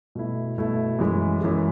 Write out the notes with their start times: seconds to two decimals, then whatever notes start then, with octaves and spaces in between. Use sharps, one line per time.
0.15 B2 A3 E4
0.58 B2 A3 E4
0.99 F#2 E3 G#3
1.41 F#2 E3 G#3